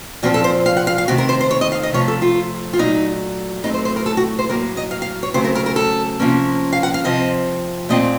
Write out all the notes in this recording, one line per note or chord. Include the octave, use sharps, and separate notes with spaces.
A#2 F3 C4 F#4
A4
C5
F5
F#5
F5
F5
C3 D#3 A3 C4 F#4
A#4
C5
C5
C#5
D#5
F5
D#5
C3 F3 A3 C#5
A4
F4
F4
A#2 F#3 A3 D#4
A2 F#3 A3 C4 D#4
C5
C5
A#4
A4
F#4
C5
A2 F#3 A#3 A#4
D#5
F5
F5
C#5
C#3 F#3 A3 C4 C5
A#4
A#4
A#4
A4
C3 F3 A#3 C#4
F5
F#5
F5
C3 F3 C4 D#5
A#2 A3 C4 D#5